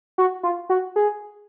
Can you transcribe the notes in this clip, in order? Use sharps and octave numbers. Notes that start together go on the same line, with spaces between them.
F#4
F4
F#4
G#4